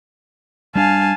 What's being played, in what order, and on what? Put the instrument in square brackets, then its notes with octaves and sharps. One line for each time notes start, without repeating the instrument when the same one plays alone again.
[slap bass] G3 D4 [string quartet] F5 G#5 A5